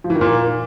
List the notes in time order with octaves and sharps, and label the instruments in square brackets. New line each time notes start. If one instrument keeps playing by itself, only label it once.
[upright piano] F3
E3
D#3
A#2